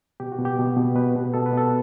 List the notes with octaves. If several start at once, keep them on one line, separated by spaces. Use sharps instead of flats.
B2 G4
F#4
B2
G4
B2
B2
B2 B4
B2
B2 A4
B4
B2 A4